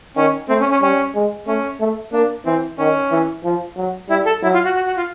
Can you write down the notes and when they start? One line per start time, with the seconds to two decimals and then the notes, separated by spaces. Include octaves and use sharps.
0.16 D#3 C#4
0.49 A3 C4
0.60 C#4
0.71 C#4
0.82 G3 C#4
1.14 G#3
1.47 A3 C#4
1.80 A3
2.12 A#3 D4
2.45 E3 C4
2.78 D#3 C#4
3.11 E3
3.44 F3
3.77 F#3
4.10 G3 E4
4.26 A4
4.43 F#3 E4
4.54 F4
4.65 F#4
4.75 F#4
4.87 F#4
4.97 F4